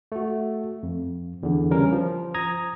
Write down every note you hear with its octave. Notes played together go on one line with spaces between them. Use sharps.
A3 F#4
F2
E2 D3
C#3 E3 G3 C#4 A#4
F3
A#5 D#6 G#6 A#6